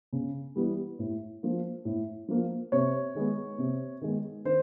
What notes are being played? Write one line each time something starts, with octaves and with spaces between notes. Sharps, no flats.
C#3
E3 G3 B3
A2
F3 A#3
A2
F3 A#3
C3 C#5
D#3 G#3 B3
C3
D#3 G#3 B3
D#3 C5